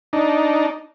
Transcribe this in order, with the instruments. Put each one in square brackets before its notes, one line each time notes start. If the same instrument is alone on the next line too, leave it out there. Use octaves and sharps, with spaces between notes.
[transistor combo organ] D4 D#4